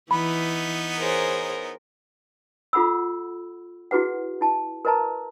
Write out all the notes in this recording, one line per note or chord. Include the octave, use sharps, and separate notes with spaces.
E3 B3 D#4 B5
G#4 A#4 C5 C#5
F4 A4 F#5 B5 E6
E4 F#4 G#4 B4 F#5
E4 A5
A#4 B4 D#5 A5 A#5